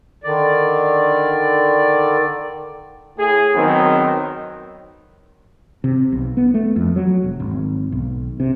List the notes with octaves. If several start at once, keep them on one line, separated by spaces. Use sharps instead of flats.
D3 D#3 D5
A2 G#4
D#3 F#3 B3 C4
C3
B1
B3
A3
F2
F#3
E1
G#1
B1
C3